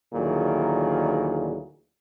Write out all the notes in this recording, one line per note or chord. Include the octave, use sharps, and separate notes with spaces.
D2 A#2 D#3 E3 F#3 G#4